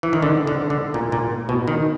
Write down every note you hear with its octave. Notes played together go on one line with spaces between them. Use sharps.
E3
D#3
D3
D3
D3
A#2
A#2
B2
D#3